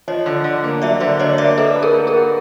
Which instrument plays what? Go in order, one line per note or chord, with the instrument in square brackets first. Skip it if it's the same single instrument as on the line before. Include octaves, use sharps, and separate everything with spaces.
[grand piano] F3 [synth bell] C#5 D#5
[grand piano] D3
D3
A#3
[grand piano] F#3 [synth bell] D5 E5
[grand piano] D3 [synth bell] C5 D5
[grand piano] D3 [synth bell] C#5 D#5
[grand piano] A#3 [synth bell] D5 E5
[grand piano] D4 [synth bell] A4 B4
[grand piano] B4
[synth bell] G#4 A#4
[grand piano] A#3
[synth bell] G#4 A#4
[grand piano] F#4